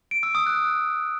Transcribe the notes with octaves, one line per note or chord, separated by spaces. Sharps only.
D7
E6
D#6
F#6